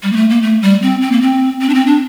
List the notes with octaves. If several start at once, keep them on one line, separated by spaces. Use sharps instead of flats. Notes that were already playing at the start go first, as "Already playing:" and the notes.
G3
A#3
A3
A#3
A3
G3
C4
C4
A#3
C4
C4
D4
C4
D4